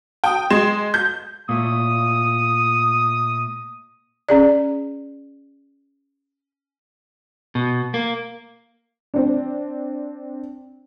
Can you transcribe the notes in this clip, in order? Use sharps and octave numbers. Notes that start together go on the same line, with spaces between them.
G5 D#6
G#3 C6 G#6 E7
G6
A#2 A3 D#6
C#4 G#4 D5
B2
A#3
C4 D4